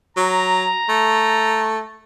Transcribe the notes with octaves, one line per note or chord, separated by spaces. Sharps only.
F#3 A#5
A3